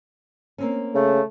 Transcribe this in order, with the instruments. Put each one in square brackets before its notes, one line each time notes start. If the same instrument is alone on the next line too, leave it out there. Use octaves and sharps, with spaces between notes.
[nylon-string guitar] A#3 C4 C#4
[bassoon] C#3 [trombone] A3